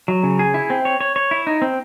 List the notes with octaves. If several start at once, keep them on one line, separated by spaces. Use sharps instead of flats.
F#3
C#3
G#4
E4
C4
C#5
C#5
C#5
E4
D#4
C4